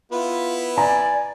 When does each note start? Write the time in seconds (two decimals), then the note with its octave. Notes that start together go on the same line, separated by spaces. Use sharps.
0.12 B3 E4 F4 B4
0.78 D5 G#5 A#5